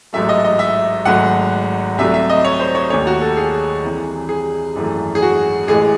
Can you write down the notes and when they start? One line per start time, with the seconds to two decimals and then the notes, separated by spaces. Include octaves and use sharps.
0.13 A1 G#2 F#3 A3 E5
0.29 D#5
0.44 D#5
0.59 E5
1.05 G#1 G#2 F#3 A3 F#5
1.98 C2 C3 F#3 A3 E5
2.14 E5
2.29 D#5
2.45 C#5
2.59 C5
2.75 C#5
2.90 D#2 D#3 A3 C#5
3.07 F#4
3.21 A4
3.37 G#4
3.84 C2 C3 E3
4.29 G#4
4.76 G#1 F#2 E3 A3
5.15 G#4
5.22 F#4
5.68 A1 A2 E3 G#3 G#4